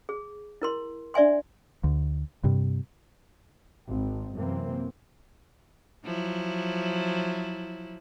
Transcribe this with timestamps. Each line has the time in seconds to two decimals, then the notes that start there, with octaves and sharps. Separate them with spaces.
0.09 G#4
0.62 E4 A#4 C6
1.14 D4 D5 E5 G#5 C6
1.84 D2
2.44 G2 C3
3.87 G#1 C4
4.36 F#2 C3 E3 A#3 C4
6.05 F3 F#3 E4